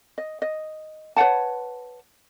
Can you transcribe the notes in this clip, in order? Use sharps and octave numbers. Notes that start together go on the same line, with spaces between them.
D#5
D#5
B4 C#5 F#5 A5